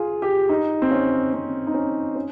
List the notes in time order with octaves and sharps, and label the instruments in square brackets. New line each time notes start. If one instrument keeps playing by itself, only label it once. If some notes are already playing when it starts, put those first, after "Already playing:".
Already playing: [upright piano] F4 G#4
G4
D#4
C4
C#4
C4
D#4
C#4
C#4